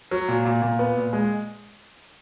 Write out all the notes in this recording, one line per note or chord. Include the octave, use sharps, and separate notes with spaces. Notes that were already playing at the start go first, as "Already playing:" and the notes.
F#3
A#2
A#2
A#2
B3
A#2
G#3